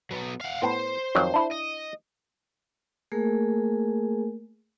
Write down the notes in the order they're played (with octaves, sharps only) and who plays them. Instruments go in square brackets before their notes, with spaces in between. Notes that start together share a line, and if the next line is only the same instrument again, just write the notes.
[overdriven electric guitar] F#3 B3
F5 F#5
[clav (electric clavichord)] A2 B3 [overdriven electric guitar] C5
[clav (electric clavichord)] F2 D#3 F#3
D4 E4
[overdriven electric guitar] D#5
[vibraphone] A3 A#3 G#4 A#4 G#5